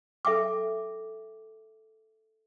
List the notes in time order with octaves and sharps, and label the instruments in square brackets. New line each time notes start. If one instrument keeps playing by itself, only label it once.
[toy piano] A4 E5 G5 D6